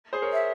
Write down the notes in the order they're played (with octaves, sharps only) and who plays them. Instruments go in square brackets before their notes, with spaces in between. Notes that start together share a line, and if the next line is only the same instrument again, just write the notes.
[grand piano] G#4 C5
A#4 C#5
[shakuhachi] E5